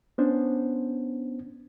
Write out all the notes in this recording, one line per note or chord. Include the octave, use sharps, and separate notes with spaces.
B3 C#4 D4 C5